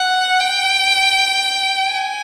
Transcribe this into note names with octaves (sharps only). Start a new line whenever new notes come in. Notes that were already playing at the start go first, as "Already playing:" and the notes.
Already playing: F#5
G5
G#5